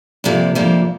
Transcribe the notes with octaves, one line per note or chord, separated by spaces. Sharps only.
F2 C3 F3 A#3 D4
F2 C3 F3 A#3 D4